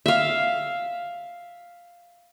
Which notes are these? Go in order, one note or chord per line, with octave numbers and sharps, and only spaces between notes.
E5 F5